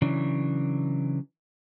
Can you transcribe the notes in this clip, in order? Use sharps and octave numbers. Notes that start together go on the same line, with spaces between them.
C#3 E3 F#3 D4